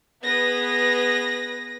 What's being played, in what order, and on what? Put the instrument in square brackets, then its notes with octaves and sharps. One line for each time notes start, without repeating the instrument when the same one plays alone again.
[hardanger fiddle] B3 G#4 [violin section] B4 A#6